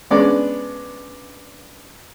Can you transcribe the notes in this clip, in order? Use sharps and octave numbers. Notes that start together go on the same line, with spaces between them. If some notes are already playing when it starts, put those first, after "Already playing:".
G#3 B3 C#4 D4 D5